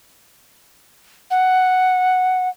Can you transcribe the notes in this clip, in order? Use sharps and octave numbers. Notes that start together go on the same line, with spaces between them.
F#5